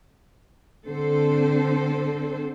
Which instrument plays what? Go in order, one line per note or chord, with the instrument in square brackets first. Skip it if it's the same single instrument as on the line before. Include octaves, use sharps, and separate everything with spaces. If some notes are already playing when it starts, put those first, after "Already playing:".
[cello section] D3 C4 A4 C5